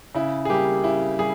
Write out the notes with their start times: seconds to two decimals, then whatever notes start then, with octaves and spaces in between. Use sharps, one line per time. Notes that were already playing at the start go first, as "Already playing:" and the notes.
0.15 C#3 E4
0.45 G#4
0.49 G3 A#3 G4
0.84 C#3 E4
1.19 G3 G#4